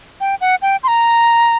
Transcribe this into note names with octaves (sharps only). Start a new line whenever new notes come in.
G5
F#5
G5
C6
A#5